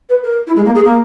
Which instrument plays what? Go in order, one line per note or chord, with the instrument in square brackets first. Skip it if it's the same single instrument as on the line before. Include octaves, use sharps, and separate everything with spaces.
[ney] B4
A#4
E4
G#3
A#3
G#4
A#3